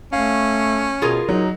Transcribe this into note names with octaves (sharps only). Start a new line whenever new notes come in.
A3 C#4 F5
B2 F4 G#4 A#4
F#3 D#4